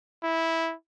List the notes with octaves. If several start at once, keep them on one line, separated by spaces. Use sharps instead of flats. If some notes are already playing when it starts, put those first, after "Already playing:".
E4